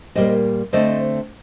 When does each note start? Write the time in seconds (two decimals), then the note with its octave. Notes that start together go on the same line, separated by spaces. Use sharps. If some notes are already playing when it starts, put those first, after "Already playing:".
0.15 A#2 G3 A#3 C5 D#5
0.73 D3 A3 C4 C5 D#5